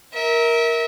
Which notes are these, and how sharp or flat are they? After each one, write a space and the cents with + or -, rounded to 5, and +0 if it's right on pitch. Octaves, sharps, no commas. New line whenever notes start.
A#4 +5 E5 -30